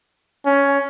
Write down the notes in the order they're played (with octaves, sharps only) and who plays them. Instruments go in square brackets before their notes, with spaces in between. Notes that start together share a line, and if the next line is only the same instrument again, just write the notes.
[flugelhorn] C#4